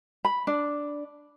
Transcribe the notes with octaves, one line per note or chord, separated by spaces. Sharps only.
B5
D4